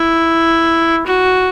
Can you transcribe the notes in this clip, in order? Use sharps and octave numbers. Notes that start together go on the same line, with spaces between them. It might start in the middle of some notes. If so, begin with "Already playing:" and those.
Already playing: E4
F#4